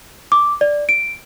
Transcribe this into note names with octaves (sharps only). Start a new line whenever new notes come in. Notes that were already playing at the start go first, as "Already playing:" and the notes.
D6
D5
D7